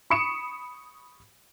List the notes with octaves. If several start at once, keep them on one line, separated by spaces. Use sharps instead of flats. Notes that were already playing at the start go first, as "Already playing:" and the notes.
B5 C#6 D#6 C#7 D7 E7